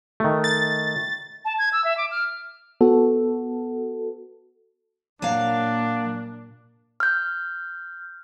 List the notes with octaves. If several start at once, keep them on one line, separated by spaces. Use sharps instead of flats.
D#3 A3
A6
A5
G#6
E6
E5
D6
F6
B3 F#4 A4
A#2 F#3 A#3 D4 F5
F6 G6